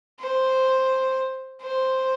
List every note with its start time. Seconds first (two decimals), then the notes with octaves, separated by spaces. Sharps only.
0.20 C5
1.62 C5